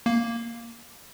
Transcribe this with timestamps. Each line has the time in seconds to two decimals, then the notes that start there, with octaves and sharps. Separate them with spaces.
0.06 A#3